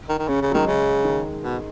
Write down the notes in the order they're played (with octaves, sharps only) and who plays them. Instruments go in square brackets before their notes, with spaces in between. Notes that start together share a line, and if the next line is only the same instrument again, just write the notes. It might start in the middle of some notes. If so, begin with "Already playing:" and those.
[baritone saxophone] D#3
D#3
[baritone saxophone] C#3 [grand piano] C#4
[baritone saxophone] C#3
[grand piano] F#3
[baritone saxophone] D#3 [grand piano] G#3
[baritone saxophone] C#3
[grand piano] D#3
[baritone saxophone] B2